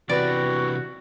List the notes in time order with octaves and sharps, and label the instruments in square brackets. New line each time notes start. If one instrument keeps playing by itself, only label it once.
[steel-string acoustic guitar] E2 G4 B4 [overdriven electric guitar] C3 E3 [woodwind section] F#4 [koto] D5